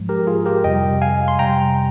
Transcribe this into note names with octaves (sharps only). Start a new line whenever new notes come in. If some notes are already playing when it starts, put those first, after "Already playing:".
Already playing: G#2 F3 G#3
G4 A#4
F4 G#4
G4 A#4
F2 C3 G3 D#5 G5
F5 G#5
C6
F2 C3 G3 G5 A#5